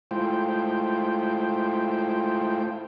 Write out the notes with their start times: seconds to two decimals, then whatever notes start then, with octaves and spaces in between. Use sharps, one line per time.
0.11 G#3 A3 E4 F4 C5 G5